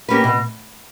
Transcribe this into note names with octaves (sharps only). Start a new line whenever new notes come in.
A#3 C#4 G4 B4
B2